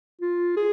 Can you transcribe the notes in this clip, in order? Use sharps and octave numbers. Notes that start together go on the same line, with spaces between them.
F4
G#4